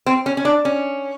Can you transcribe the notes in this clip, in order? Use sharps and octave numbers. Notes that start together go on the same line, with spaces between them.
C4
C#4
C#4
D4
C#4